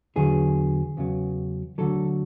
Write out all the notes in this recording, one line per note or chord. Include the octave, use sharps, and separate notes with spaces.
E2 D3 F#3 G#4
E2 C#3 F#3
D2 D3 F#3 A4